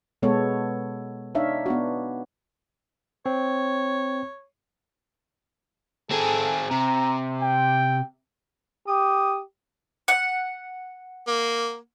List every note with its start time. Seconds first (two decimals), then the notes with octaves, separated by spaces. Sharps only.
0.22 B2 G#3 B3 A4 C#5
1.35 D4 D#4 C#5 E5 F5
1.66 B3 D4 F#4
3.26 C4 C#5
6.11 C4 G#4 A4
6.71 C3 A#5
7.42 G5
8.88 G4 D#6
10.08 F#5
11.27 A#3